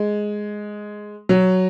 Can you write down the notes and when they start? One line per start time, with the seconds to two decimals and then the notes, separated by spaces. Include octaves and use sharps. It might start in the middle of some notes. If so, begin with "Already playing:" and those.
Already playing: G#3
1.29 F#3